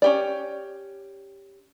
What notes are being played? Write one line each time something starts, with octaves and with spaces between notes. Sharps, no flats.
C#4 G4 D5